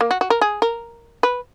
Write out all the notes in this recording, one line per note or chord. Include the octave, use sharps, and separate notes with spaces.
A#3
F#4
F#4
A#4
G#4
A#4
B4